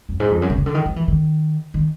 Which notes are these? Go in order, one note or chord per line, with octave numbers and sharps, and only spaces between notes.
F#2
G#2
F2
F#2
C3
C#3
D3
D#3
F3
E3
D#3
D#3